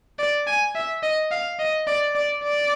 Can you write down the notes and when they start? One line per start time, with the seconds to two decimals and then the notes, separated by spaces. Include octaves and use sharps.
0.19 D5
0.47 G#5
0.75 E5
1.03 D#5
1.31 F5
1.59 D#5
1.87 D5
2.15 D5
2.44 D5